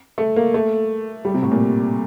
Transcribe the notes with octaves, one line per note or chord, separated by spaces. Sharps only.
A3
A#3
A3
G3
C3
A2
A#2